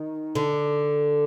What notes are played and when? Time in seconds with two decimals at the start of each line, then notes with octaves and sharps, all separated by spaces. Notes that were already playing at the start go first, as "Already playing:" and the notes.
Already playing: D#3
0.35 D3